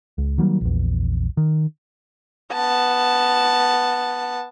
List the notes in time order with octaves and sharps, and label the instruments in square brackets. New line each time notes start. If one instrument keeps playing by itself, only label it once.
[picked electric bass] C#2
D#3 F#3 G3 A#3
A#1 E2
D#3
[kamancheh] B3 A5